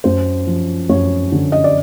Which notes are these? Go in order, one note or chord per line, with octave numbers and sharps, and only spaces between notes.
F#2 C5
F3
F#2 C#5
D3
D#5
D5